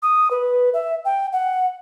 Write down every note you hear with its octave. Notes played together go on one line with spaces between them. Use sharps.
D#6
B4
E5
G5
F#5